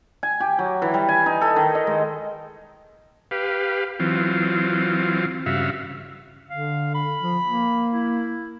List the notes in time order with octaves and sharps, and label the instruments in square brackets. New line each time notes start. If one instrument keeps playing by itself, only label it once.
[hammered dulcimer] G#5
G4
F#3
E3
G3
G#5
D#4
A4
D#3
D#5
G#3
[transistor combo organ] G4 B4 F5
E3 F#3 C4 F4
G2 C#3 F#4 E5 F5
[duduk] D3 [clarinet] F5
[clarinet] B5
[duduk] F3
A#3
[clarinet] E4